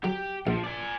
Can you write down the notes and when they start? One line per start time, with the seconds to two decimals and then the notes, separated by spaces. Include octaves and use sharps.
0.04 F#3 G4
0.47 A#1 F3
0.64 D5 G#5